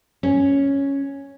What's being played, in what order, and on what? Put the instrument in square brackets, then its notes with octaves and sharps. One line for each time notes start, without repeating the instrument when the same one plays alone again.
[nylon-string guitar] C#4